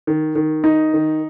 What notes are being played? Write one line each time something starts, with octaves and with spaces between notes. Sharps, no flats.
D#3
D#3
D#4
D#3